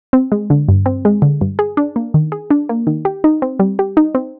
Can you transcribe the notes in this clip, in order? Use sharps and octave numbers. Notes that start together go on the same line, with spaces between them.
C4
G#3
D3
G2
C4
G#3
D3
G2
G#4
D4
A#3
D#3
G#4
D4
A#3
D#3
G4
D#4
C4
G3
G4
D#4
C4